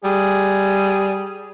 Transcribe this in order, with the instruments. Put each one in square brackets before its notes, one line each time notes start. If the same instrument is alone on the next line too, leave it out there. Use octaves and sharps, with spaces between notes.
[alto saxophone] G3 [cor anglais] G#4